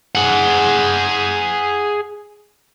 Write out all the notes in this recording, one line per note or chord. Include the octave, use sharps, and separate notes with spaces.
G#4 F#5